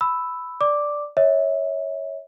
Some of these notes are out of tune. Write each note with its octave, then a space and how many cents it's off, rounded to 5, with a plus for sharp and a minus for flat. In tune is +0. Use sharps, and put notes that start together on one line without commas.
B5 +10 E6 +0
D5 +0 D6 +0
C#5 +0 E5 -35